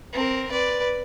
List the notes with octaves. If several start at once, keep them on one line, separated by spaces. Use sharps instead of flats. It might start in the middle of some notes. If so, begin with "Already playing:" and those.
C4 A#4
B4 D5